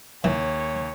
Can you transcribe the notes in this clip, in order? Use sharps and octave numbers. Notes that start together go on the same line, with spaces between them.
D#2 E3 C#5